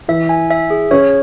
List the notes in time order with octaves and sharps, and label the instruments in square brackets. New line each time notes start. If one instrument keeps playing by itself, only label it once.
[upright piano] E3 [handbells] E5
[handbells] G#5
E5
G#4
[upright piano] C#4 [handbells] C#5